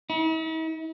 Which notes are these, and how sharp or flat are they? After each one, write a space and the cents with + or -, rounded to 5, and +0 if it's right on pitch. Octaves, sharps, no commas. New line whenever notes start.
E4 -45